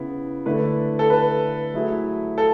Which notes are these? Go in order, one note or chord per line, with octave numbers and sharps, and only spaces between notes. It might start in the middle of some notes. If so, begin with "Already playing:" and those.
Already playing: C#3 B3 E4
D3 A3 E4 B4
A4
B4
F#3 A3 E4 G#4
A4